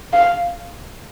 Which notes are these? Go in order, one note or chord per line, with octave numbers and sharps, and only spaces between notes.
F5